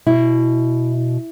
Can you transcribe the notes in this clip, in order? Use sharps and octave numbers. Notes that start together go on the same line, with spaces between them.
B2 E4